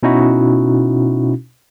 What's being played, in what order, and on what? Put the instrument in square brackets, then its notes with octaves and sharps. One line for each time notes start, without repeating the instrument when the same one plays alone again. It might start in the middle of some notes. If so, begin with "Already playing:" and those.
[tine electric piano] B2 C#4 D#4 E4 F#4